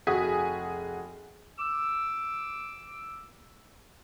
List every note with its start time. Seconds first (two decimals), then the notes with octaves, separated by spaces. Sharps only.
0.07 F1 F#4 G#4 G#5 D#6 B6
1.58 D6 E6